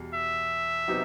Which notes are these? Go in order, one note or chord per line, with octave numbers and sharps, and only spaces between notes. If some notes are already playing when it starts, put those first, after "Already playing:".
Already playing: E2 B2 G3
E5
C3 F#3 B3 D#4